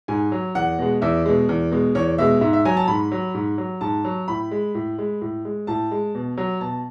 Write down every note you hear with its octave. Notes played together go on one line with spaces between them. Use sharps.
G#2 G#5
F#3
E2 F#5
B2 G#3
E2 E5
B2 G#3
E2
B2 G#3
E2 C#5
B2 G#3 E5
G#2 E5
E5
F#3 G#5
A5
G#2 B5
F#3
G#2
F#3
G#2 A5
F#3
A2 B5
G#3
A2
G#3
A2
G#3
A2 A5
G#3
B2
F#3
B2 A5